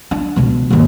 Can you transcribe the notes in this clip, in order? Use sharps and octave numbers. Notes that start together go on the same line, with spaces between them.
D4
C#2 B2
D#2 G#2